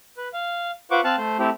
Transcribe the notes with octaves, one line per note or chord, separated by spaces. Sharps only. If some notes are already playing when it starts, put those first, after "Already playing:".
B4
F5
F4 B4 C5 F#5 C#6 D6
C4 F5 A5 F#6
A3 C5
A3 C4 E4 G4